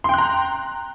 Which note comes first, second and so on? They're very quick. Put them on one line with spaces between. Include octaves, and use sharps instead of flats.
C6 G5 F#6 A#5